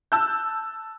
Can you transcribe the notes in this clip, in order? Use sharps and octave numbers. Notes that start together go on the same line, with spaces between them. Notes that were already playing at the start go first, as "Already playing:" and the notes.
A5 E6 F#6 G6